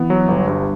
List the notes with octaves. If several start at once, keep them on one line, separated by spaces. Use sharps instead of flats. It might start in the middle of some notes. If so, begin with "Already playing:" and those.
Already playing: E3 B3
F#3
G1
G2